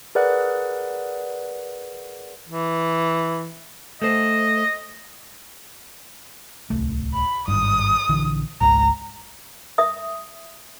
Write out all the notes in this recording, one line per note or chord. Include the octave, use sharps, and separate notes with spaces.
G#4 A#4 B4 D5 F#5 F#6
E3
A3 C5 D#5
D1 C2 A3
B5
G#1 G2 D#6
A#1 D3 E3
G#1 C#2 G#3 A#5
E5 D#6